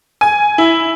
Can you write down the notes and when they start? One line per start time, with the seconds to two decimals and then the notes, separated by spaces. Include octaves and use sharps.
0.21 G#5
0.58 E4